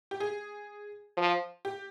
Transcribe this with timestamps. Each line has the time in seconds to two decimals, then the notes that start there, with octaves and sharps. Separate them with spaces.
0.11 G4
0.20 G#4
1.17 F3
1.65 G4